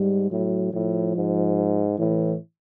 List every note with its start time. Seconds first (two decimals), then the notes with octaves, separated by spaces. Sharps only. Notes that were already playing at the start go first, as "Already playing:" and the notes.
Already playing: G#2 G3
0.31 A2 F#3
0.73 A2 F3
1.15 G#2
1.98 A2 E3